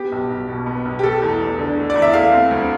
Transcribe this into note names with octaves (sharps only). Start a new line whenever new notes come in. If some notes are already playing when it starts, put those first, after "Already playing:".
Already playing: B3 G4
B1
B1
B2
B3
B1
G4
A3 A4
E2
E2
D3
A3
D5
E2
E5
A3 F5
C4
D2